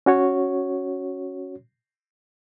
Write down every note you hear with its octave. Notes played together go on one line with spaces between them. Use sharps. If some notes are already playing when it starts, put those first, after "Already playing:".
C#4 F#4 C#5